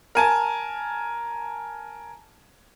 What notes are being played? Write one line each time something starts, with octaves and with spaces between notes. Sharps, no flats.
A#4 G#5 A5